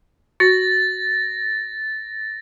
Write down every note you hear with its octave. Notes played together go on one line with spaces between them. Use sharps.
F#4 A6 A#6